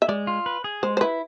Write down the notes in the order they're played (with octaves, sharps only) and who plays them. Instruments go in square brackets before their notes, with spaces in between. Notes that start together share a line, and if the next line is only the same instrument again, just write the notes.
[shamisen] E5
[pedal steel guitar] G#3 [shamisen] D5
[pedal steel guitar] F4
B4
G#4
[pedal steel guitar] G#3 [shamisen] C5
[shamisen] C5
[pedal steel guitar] E4 [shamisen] B4